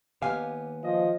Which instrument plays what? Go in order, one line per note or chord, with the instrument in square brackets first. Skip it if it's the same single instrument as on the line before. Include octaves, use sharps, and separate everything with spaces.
[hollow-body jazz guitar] D#2 F5 [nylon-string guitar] B3 G4 G#5
[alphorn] F3 [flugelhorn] D#5